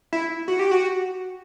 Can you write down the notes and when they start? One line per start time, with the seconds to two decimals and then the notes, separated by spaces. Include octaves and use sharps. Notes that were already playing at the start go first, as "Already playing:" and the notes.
0.13 E4
0.48 F#4
0.59 G4
0.71 F#4